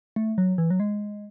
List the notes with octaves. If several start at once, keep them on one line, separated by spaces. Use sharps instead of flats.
A3
F#3
E3
F#3
G#3